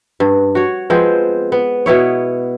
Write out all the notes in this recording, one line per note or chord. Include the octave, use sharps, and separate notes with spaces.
G2
F#4 C#5
F3 G#3 B3 C4
B3
B2 B3 E4 C#5